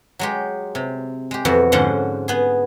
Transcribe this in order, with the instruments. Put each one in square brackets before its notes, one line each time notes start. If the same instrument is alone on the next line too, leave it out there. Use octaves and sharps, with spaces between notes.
[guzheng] F#3 G#3 G4
C3
G#3 G4
F2 B2 E3 F#4
G#2 D3 F3 C#4 C5 F#5
B3 G#4